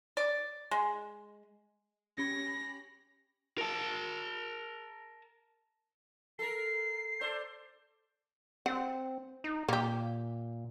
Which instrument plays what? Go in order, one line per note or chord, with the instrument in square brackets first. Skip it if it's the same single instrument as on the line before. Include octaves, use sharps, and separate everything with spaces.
[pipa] D5
G#3
[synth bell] C#4 G4 B5 [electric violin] A#6
[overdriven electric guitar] A#4 A5
[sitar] A4 A#4 [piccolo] C7
[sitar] A4 C5 D5
[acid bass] C4 [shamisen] F#5
[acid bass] D#4
[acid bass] A#2 [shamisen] A#3 G4